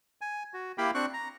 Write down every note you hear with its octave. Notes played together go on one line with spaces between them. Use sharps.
G#5
F#4
A#3 E4 G4 F5 G5 B5
C4 D4 C#6 F#6
A#5